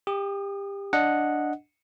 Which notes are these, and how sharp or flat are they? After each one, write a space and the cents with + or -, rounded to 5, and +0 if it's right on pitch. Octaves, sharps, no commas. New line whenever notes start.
G4 +25 D#6 -25
D4 +0 D#5 +0 F#5 -5